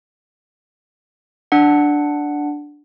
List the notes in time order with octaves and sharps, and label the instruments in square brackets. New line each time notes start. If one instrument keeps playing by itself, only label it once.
[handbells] D4 F#5